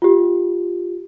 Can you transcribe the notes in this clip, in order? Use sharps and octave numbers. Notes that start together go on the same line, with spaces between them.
F4 G4